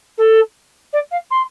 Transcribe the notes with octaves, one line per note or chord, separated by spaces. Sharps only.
A4
D5
F5
C6